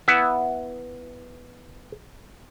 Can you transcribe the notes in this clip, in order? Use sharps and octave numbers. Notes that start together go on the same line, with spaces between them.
B3 E4 E5 F#5